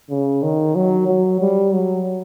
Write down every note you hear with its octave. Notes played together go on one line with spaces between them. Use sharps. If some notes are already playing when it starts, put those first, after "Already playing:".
C#3
D#3
F#3
F#3
G3
F#3